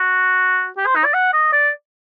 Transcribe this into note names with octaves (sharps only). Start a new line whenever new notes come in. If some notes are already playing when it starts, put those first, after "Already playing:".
Already playing: F#4
G4
C5
D#4
D5
F#5
D#5
D5